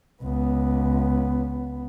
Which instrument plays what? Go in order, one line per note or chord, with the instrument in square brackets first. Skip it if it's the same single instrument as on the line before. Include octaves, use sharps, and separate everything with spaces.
[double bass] C#2 B3